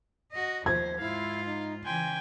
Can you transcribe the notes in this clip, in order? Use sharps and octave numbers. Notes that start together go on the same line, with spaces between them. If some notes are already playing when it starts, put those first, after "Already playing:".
F#4 D#5
D#2 F3 C5 G#6
G#2 E4 F4 F5
D#4
C#3 E3 G5 G#5 C6